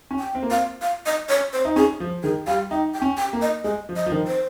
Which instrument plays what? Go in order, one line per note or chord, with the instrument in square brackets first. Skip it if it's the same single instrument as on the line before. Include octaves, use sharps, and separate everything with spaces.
[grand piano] C#4
[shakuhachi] G5
[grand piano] C4
A#3
[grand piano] C4 [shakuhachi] F5
[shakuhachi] F5
D#5
C#5
C5
[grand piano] D#4
[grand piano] C#4 [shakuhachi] G#4
[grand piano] F3
[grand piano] D#3 [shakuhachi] G#4
[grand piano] G3 [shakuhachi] F5
[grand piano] D#4 [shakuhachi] G5
[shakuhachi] G5
[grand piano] C#4
[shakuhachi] G5
[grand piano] A#3
[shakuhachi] D#5
[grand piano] G#3 [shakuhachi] D#5
[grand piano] F3
[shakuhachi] D#5
[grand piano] F3
D#3
[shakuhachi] C5